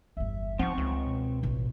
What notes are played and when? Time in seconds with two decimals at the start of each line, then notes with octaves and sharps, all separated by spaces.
0.17 G1 E2 E5
0.59 F3 C4 D#4 F#5 C#6
0.78 C#2
1.06 B2
1.43 A1 E4